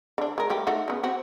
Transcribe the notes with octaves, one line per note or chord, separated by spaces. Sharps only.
D3 D4
G#3 A#4
G3 A3 G4
A3 D#4 F#4
C#3 B3
C4 F#4